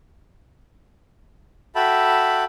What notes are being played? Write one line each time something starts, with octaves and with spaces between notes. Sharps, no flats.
F#4 A4 E5 G5 A5 B5